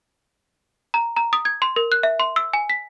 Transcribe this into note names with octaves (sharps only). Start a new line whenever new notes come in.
A#5
A#5
D#6
G#6
C6
A#4
F#6
E5
C6
E6
G#5
B6